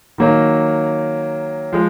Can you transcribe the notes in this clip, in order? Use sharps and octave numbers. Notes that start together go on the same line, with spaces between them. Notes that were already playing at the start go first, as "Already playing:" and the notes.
D#3 F#3 A#3 D#4
F3 G#3